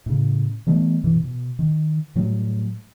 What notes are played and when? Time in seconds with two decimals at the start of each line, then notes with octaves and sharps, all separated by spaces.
0.06 A2 C#3
0.67 E3 G3 A3 B3
1.03 F#2 B2 E3
1.22 B2
1.59 D#3
2.15 A2 F#3 G3 A3